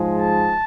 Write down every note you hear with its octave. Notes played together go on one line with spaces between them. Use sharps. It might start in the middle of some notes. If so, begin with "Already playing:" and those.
Already playing: G#2 F3 G#3
A5